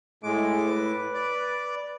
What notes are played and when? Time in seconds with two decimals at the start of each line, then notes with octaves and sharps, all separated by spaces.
0.23 A2 G#3 D6
0.68 B4
1.14 D5